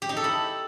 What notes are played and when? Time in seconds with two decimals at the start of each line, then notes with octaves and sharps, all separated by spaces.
0.02 G4
0.09 D#4
0.17 A4
0.24 E4